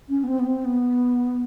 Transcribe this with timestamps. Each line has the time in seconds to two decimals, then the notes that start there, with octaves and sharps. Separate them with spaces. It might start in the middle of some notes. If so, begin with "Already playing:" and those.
0.09 C#4
0.24 B3
0.28 C4
0.39 B3
0.46 C4
0.65 B3